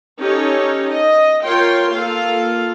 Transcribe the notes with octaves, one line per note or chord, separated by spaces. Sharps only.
C#4 D#4 G4 A4 C#5
D#5
F4 A#4 C#5 G5 C6
A#3 F4 A4 F5